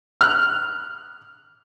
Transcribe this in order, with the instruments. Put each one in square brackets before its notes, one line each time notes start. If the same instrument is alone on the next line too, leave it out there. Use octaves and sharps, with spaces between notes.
[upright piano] F6 F#6